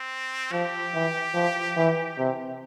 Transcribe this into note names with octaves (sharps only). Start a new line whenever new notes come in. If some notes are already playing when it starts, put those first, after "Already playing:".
Already playing: C4
F3 G4
E3
F3
E3
C3